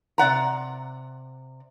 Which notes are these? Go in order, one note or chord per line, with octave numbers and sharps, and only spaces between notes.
C3 D5 F#5 A#5